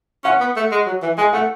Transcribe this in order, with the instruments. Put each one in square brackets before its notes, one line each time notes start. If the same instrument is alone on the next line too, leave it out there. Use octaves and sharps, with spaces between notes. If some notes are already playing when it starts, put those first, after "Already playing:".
[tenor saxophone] C#4 [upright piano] F#5
[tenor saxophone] B3
A3
G#3
F#3
E3
[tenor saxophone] G#3 [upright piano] G#5
[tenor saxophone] A3 [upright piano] F#5